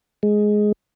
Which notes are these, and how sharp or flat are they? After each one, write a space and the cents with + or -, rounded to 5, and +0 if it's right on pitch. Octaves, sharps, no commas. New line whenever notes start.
G#3 +10